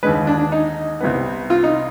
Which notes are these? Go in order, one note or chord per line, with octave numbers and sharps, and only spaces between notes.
D#2 D3 G#3 B4
D4
D4
D#4
C2 C3 G3 B3
F4
D#4